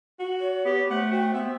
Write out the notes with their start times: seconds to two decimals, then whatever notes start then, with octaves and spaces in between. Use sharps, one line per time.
0.19 F#4
0.41 C#5
0.65 B3 G4
0.91 A3 C5 F#5
1.11 F#4 G5
1.34 B3 C5 E5